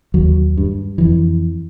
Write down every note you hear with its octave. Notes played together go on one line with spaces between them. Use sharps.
D#2 F#3
G2
F2 E3